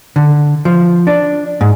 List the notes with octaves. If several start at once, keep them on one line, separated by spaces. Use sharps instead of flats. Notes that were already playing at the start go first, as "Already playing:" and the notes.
D3
F3
D4
G#2